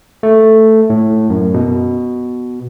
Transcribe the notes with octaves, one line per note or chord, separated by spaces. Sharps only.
A3
A2
F#2
B2